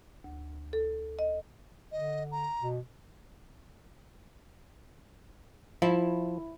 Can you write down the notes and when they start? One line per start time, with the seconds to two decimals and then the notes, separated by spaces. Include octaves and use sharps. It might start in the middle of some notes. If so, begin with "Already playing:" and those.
0.24 D2
0.73 A4
1.19 D#5
1.92 D3 D#5
2.32 A#5
2.61 B2
5.82 F3 E4